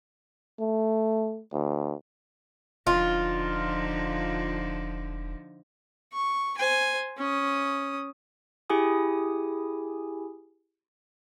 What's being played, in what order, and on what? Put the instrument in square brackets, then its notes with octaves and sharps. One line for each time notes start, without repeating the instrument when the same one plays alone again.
[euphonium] A3
D2
[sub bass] E1 [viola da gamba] D3 F3 D#4 [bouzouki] F4
[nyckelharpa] C#6
C5 G#5
C#4 D#6
[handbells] E4 G4 G#4 G#5 D#6